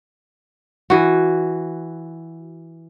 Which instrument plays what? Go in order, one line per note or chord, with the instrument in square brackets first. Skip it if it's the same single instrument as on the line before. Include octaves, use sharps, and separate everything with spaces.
[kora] E3 F#4